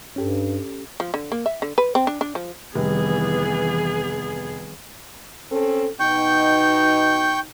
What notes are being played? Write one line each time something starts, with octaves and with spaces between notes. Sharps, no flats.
G2 C#4 G4 A4
F3
D3
A#3
E5
D3
B4
C4
D4
D4
F3
F1 D#3 E3 G3 B3 G#4
C4 C#4 A4
B2 D#4 G5 C#6 G6